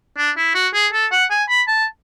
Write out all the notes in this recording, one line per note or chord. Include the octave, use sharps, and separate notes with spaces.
D4
E4
F#4
G#4
A4
F#5
G#5
B5
A5